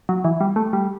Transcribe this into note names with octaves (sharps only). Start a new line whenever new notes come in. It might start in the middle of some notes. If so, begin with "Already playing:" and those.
F#3
E3
G3
A3
G3